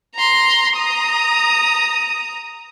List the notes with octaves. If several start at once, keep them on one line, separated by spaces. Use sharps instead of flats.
A#5 C6
A#5 D#6